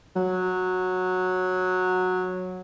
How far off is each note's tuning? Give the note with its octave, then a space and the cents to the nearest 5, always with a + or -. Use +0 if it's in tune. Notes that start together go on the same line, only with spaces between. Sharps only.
F#3 -10